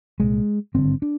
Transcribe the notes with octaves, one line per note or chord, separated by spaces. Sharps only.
C2 A#2 G#3
G#1 G2 D3 C4
D4